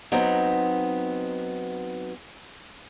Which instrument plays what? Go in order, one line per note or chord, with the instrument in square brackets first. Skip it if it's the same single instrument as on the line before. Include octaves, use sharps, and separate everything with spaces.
[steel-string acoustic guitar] F#3 B3 C4 D#4